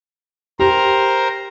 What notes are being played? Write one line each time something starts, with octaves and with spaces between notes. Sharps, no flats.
G4 A#4 C5 A#5